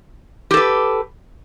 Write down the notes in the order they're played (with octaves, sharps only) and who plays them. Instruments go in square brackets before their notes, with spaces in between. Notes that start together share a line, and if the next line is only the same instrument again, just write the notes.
[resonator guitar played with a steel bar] G4
A4
B4